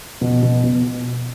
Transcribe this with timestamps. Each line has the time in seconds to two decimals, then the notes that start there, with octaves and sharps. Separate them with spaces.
0.21 B2
0.43 B2
0.64 B2